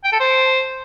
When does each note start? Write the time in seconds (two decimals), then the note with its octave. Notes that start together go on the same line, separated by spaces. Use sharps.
0.04 G5
0.12 A4
0.20 C5